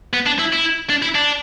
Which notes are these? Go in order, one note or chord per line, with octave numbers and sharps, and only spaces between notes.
B3
D4
E4
E4
D4
E4
D4